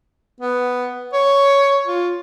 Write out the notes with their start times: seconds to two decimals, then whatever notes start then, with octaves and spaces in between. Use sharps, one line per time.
0.41 B3
1.13 C#5
1.87 F4